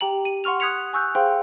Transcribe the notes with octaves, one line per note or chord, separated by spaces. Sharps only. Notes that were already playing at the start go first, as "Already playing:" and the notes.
G4 G5 A#5 F#7
D#7
F#5 C6 C#6 F6 F7
D#6 F#6 G#6 B6 C#7 F7
G#5 C#6 E6 F#6 G6
G#4 C5 F5 G5 C6